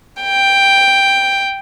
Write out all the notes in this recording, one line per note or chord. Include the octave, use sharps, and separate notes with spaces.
G5